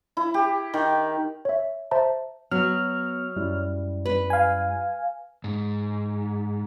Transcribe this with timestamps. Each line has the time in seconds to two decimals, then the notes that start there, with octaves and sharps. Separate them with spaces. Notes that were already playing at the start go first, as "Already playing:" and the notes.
0.17 E4
0.34 G4
0.73 D#3
1.45 C#5 E5
1.91 C5 E5 A5 A#5
2.51 F#3 B3 F6
3.36 F#2 G3 E4
4.06 B4
4.30 F5 G#5
5.44 G#2